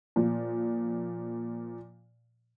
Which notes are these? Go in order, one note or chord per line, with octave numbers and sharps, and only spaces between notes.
A#2 F3